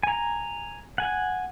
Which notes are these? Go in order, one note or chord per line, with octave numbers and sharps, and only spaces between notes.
G#5 A#5
F#5 G#5